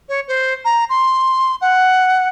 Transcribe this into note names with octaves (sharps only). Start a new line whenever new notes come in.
C#5
C5
A#5
C6
F#5